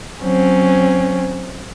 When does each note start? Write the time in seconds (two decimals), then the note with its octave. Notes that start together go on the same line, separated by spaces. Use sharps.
0.22 F#3 C4 C#4